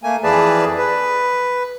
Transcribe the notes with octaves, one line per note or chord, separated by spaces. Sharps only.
A3 A#3 G#5
F2 E3 G#4 B4 D5 A5
B4